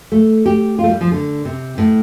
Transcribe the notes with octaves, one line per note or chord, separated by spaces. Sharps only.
A3
G4
F4
A3
G3
F3
D3
C3
A2